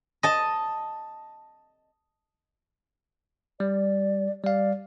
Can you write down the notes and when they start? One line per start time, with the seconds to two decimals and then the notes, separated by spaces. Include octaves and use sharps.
0.23 D#5 A5
3.60 G3 D5
4.44 G3 D5 F5